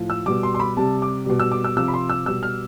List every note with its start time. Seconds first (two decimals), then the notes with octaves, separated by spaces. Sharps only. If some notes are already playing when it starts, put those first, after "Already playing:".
Already playing: A2 F3
0.10 E6
0.26 B2 G3 D6
0.43 C6
0.55 C6
0.60 B5
0.77 C3 G3 A5
1.02 D6
1.26 B2 G3
1.40 E6
1.52 D6
1.64 E6
1.77 C3 F3 E6
1.88 B5
1.94 C6
2.10 E6
2.26 B2 G3 E6
2.43 F6